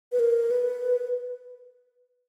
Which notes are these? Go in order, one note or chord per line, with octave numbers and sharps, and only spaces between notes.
B4
A#4
B4